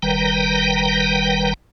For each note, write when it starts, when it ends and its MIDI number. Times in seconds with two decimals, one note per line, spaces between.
0.02 1.53 30
0.02 1.53 51
0.02 1.53 55
0.02 1.53 71
0.02 1.53 79
0.02 1.53 82